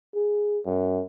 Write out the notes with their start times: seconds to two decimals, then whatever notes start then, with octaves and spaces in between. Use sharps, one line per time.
0.15 G#4
0.66 F#2